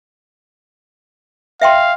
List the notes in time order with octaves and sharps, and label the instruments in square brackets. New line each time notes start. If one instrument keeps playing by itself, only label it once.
[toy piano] E5 G5 C6 [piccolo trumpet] F5